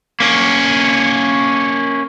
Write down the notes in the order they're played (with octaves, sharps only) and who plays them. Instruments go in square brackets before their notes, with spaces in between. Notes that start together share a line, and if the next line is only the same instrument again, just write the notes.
[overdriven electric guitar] A#3 C#4